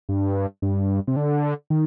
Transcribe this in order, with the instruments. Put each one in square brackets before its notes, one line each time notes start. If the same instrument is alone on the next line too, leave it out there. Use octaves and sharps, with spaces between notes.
[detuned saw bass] G2
G2
C3
D3
D#3